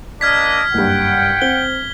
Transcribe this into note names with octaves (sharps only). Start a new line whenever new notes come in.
A#3 D4 D#5 F6 G#6 B6
F#1 G2 F#5 G5
C4 G7